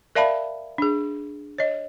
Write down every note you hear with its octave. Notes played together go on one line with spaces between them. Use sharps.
A#4 D5 E5 F5 A5 B5
D4 G#4
C#5 D#5